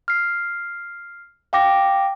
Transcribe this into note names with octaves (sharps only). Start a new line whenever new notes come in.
F6 C7
F5 G5 D6 A#6